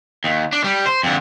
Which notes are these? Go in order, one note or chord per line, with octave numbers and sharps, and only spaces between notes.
D#2
D4
G3
C5
F2 D3